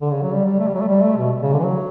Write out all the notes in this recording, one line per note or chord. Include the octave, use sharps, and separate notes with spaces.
D3
C#3
F#3
G3
G3
A3
G3
F#3
A3
G3
A3
B2
C#3
D3
E3
F#3